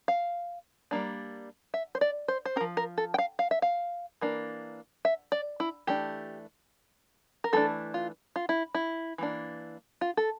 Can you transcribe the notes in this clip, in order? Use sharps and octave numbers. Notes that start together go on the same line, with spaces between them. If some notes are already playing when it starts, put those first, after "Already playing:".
F5
G3 A#3 D4
E5
C5
D5
C5
C5
C4 A#4
F3
A#4
A4
G5
F5
F5
E5
F5
E3 A#3 D4
E5
D5
E4
E3 A3 D4 G4
A#4
E3 A3 D4 A4
F4
F4
E4
E4
E3 A#3 D4
F4
A4